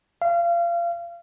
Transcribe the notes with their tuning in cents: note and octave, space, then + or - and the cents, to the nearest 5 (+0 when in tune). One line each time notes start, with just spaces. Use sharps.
F5 -30